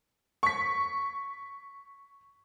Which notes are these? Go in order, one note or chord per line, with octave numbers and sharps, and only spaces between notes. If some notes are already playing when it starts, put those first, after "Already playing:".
C#6 B6